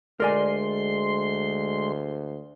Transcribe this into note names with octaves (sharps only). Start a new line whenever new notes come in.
D2 G#3 A#4 D5 G#5 C6